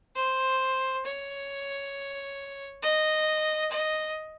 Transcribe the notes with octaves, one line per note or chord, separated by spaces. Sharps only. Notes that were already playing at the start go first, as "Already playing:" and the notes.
C5
C#5
D#5
D#5